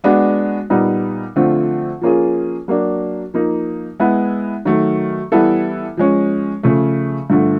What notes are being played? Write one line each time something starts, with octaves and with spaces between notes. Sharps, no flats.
G#3 B3 D4 F#4
A#2 G3 B3 D#4
D3 F3 A3 C4 F4
F3 A#3 C#4 F4 G#4
F#3 A#3 D4
F3 A#3 D#4
G#3 B3 E4
D#3 F#3 A3
E3 G3 B3 E4 A4
F3 G#3 C#4
C#3 F3 A3
G2 D3 F3 A3